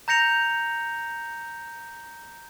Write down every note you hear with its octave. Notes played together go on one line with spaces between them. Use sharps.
A#5 G6 A#6 C#7 F7